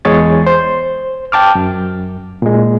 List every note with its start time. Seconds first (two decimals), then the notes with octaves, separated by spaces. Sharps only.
0.05 E2 G#3 G#4 C#5 A6
0.47 C5
1.32 G5 A5 D6 F6
1.55 F#2
2.42 A#2 G#3